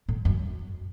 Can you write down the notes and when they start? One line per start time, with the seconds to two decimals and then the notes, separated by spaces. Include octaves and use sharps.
0.09 A2
0.25 F#2